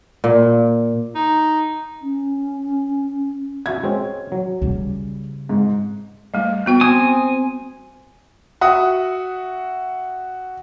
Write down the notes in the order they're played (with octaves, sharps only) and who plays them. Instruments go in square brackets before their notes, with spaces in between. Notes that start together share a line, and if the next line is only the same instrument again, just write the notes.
[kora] A#2
[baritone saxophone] D#4
[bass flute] C#4
[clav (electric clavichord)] F#4 E5 F#5 [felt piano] G#6
[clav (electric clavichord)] G#3 C4 C#4
F#3
[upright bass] C#3 G3
[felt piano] G#2
[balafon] G3 A3
B3 F#4 G5
[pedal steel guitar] C4 G#5 D#6
[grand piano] F#4 E5 F#5 D#6